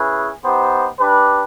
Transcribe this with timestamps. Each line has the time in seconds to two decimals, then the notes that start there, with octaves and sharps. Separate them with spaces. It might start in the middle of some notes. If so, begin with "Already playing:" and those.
Already playing: C#4 E4 G#4 B4
0.42 B3 D#4 G4 C5
0.99 D4 G4 B4